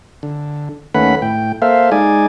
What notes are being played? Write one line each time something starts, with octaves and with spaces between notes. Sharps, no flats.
D3
D#2 A3 C#4 B4 F#5 B5
A2 G5
A#3 A4 C5 E5 F5
G#3 D#4 D5 G#5